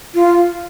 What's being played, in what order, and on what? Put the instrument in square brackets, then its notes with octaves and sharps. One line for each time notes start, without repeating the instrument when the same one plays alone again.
[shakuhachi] F4